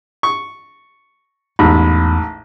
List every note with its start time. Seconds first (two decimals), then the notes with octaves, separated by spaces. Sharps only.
0.23 C#6
1.59 A1 E2 G#2 B5